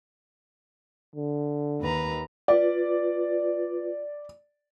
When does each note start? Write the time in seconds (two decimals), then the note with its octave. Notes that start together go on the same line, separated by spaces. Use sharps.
1.16 D3
1.81 D#2 B4 A#5
2.48 F4 B4 D5